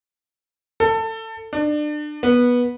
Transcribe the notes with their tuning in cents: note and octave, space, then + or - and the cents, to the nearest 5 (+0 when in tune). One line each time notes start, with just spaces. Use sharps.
A4 +20
D4 +30
B3 -15